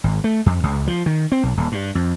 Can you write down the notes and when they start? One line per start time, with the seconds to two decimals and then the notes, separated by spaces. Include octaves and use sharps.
0.04 G#1
0.24 A3
0.46 F2
0.63 C#2
0.87 F3
1.06 D#3
1.32 C4
1.43 B1
1.57 D#1
1.72 G2
1.95 F2